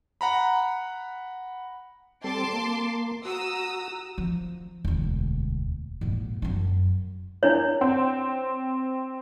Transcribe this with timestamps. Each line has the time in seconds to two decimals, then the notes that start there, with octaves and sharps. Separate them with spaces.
0.21 F#5 A#5 B5
2.24 G3 C4 A4 A5 C6 D6
2.53 A#3
3.25 F#4 A#5 D#6 E6
4.18 F3
4.85 E1 D2
6.01 A#1 G#2
6.42 F#2 D4
7.43 D4 E4 C#5
7.81 C4